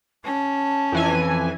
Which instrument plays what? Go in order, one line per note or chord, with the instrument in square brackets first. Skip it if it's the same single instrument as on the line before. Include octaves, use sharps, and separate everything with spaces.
[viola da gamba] C#4 [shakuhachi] A5
[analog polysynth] F2 E3 G#5